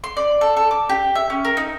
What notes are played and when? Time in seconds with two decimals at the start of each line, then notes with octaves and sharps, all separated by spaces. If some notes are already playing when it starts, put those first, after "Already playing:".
0.04 C6
0.17 D5
0.41 A4
0.57 A4
0.71 D6
0.89 G4
1.15 E5
1.30 C#4
1.45 A#4
1.57 D#4